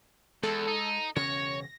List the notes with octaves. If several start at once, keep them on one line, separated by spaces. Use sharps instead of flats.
E2 G#3 A4
D#4
E1 C#3 C#4 C#5 A#6